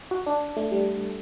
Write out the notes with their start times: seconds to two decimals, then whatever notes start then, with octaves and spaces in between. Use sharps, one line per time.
0.11 F#4
0.26 D4
0.57 A3
0.72 G3